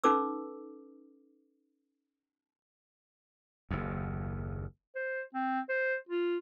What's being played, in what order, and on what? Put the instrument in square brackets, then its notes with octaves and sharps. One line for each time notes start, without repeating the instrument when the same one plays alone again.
[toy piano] C#4 D#4 A4 B4 D6 E6
[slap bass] F#1 D#2
[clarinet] C5
C4
C5
F4